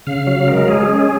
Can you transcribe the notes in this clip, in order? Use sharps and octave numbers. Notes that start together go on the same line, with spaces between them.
C#3 F5
F#3 F5
G#3 A#4
G#3 G#4
C#4